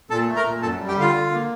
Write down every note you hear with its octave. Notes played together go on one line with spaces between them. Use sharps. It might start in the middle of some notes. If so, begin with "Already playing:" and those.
A#2 A4 A5
A3
A#4 A#5
A#2
F#2 A4 A5
G3
G4 G5
D3 F4 F5
D3
A#3